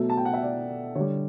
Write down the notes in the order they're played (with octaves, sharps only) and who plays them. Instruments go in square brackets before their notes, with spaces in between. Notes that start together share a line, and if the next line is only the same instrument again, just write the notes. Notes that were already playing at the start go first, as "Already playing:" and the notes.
Already playing: [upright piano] B2 F#3 A3
A5
G5
F#5
E5
D5
D3 C#5
G3